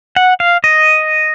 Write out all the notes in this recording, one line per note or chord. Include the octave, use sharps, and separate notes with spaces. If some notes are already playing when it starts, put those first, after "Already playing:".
F#5
F5
D#5